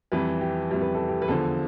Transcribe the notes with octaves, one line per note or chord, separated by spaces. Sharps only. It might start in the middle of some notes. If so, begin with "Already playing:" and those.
F2 E3 G3 B4
G4
F2 E3 G3
B4
A4
G4
B4
E2 D3 F3 A4